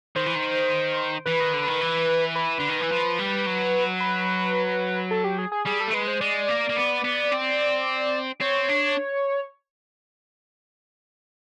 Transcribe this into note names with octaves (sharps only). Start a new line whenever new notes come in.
D#3 C5
E3
D#3
E3 B4
D#3
D3
D#3
E3
B4
D3
D#3
E3
F3
G3
F#3
B4
A4
G4
G#4
G#4
G3 G#4
A4
A3
G#3 B4
C5
G#3 D5
A#3
A#3
B3
B3
C4
C4 C#5
D4